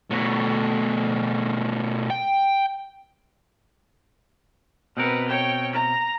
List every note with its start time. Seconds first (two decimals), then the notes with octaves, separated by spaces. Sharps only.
0.11 B2 A3
2.10 G5
4.97 B2 C4 A#4 B4 F#5
5.28 C#5 G5
5.73 A#5